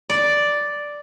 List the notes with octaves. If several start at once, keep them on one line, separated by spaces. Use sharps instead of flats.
D5